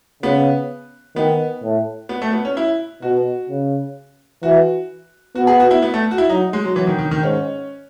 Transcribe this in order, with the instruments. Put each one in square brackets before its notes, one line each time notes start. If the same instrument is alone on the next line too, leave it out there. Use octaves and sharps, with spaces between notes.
[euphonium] C#3 [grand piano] B3
[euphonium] D#3 [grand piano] B3
[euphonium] A2
[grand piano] B3
A3
B3
C#4
E4
[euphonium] B2 [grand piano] F#4
[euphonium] C#3
[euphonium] E3 [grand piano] F#4
[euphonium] B3 [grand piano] F#4
[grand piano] G#4
F#4
E4
B3
A3
F#4
E4
[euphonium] F#3 [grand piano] D#4
[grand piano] G#3
F#3
[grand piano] E3 [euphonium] F#3
[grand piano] D#3
D#3
D#3
[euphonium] G#2 [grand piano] C#4